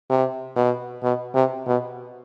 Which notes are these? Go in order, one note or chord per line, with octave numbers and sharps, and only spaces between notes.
C3
B2
B2
C3
B2